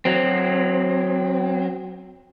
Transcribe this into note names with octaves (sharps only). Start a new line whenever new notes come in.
F#3 C4